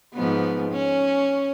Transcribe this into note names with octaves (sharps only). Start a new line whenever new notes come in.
G#2 F3 B3
C#4